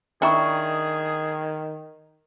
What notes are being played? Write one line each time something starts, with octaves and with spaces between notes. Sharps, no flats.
D#3 D4 E4 G#4 G5 A#5 C#6